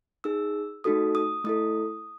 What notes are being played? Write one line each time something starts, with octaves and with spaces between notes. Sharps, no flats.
D#4 G#4 E6
A3 D#4 F#4 A4 D#6
D#6
A3 E4 A4 D#6